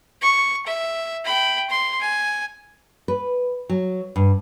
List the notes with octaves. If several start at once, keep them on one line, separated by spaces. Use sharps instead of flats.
C#6
E5
G5 B5
C6
G#5
B4
F#3
G2